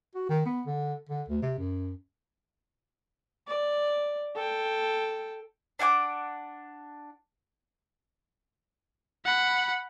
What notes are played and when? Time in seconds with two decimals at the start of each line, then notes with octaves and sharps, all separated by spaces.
0.15 F#4
0.29 D#3
0.46 B3
0.66 D3
1.09 D3
1.29 D2
1.42 C3
1.58 F#2
3.47 D5
4.35 A4 G5
5.79 D4 F#5 G5 D6
9.25 F#5 B5